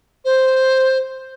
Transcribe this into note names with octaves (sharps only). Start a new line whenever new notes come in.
C5